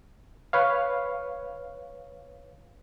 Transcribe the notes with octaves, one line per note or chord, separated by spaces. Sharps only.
B4 C#5 F5